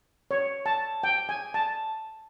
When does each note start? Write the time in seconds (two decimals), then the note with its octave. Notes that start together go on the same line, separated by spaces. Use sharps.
0.31 C#5
0.66 A5
1.03 G5
1.29 G#5
1.54 A5